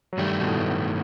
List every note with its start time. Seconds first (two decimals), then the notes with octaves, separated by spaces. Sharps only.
0.13 F#3
0.18 G2 D#3 G3 A3
0.41 B2
0.47 A2